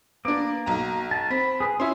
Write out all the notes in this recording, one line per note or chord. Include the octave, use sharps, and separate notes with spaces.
A#3 B3 D4 D6
B1 A#5
A5
C4 B5
G#4 B4
C#4 E4 B4 E5 C6